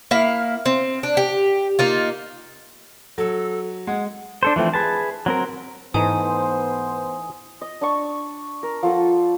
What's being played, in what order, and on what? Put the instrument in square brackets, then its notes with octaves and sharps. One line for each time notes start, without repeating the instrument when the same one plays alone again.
[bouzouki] A#3 E4 F5
C4
D4
G4
A#3 D#4 F4
[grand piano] F#3 [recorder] A4
[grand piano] G#3 [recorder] F#5
[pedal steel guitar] D4 A4 C5
E3 F3 A3 C4
G#4 B4 A5
F#3 C4 A#4
[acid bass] G#2 [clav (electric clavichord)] E3 A3 D#4 [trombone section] B3 C5 [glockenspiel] G#5 D#6
[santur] D#5
D4 A5 C#6
A#4
F3 A4 F#5